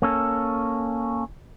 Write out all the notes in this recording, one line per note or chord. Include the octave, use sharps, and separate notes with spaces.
A#3 C#4 A4